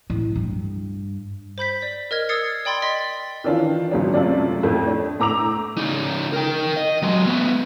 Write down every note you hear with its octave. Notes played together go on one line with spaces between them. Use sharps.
A2
G2
C5 B5 G6 B6
D5
A#4 D#5 F6 G#6
D#6 E6 G#6 A6 C7 C#7
D5 G5 B5 C6 A6 G7
D#5 C6 A6 B6
D#3 E3 D4 F4
G#1 C#2 F#3 D4
F#2 C3 A3 F4 D5
F2 A2 C4
D4
A2 A#5 D6 E6 F7
C#3 D#4
A#4 G5
D#5
F#3 G#3
A3 B3